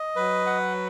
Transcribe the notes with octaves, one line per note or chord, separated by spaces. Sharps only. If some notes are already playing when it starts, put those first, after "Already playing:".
Already playing: D#5
F#3 B4
F#5